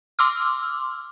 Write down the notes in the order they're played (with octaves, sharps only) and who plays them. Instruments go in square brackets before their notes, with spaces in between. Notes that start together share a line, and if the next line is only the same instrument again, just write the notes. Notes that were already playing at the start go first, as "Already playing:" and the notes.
[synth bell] C6 D6 E6 F6